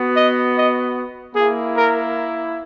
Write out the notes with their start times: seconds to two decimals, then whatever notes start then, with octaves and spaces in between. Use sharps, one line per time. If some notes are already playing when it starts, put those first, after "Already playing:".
Already playing: B3 F#4
0.16 D#5
0.56 D#5
1.35 A#3 E4 G#4
1.76 A#4